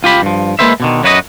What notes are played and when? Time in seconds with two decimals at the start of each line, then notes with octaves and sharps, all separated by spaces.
0.03 C#2 F4 G4 B5
0.22 G2 F3
0.59 G#3 A#3 C4 B4 C5 E5
0.80 B2 D3 D#3
1.03 F#2 F#3 F#4 B4 C5 D#5